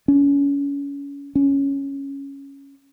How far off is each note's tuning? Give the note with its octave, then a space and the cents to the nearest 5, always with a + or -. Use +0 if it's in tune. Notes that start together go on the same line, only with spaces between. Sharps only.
C#4 +30
C#4 +0